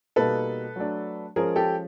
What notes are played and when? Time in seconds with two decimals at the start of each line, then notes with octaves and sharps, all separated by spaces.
0.16 B2 G3 A#3 D#4 A4 B4
0.76 F#3 A3 D4
1.36 F3 G#3 C#4 G#4 A#4
1.56 G4 A4